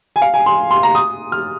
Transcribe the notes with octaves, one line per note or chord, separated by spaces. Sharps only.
G#5
F5
G#5
C6
C6
A#5
D#6
F6